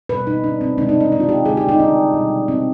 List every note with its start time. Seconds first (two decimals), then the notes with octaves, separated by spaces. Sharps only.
0.09 B2 G3 B4
0.27 D#4
0.44 D4
0.61 C4
0.78 C3 D#3 G#3 D4
0.89 D#4
1.00 D4
1.12 D4
1.20 F4
1.29 G4
1.45 D3 G#3 G#4
1.57 G4
1.69 D#4
1.80 D4
2.14 B2 G3
2.48 C4